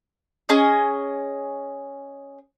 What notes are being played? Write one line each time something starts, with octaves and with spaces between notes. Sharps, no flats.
C#4 G#4 D#5